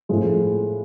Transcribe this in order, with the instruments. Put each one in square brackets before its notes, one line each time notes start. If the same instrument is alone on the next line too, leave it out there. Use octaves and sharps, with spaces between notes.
[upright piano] A2 F3 G#3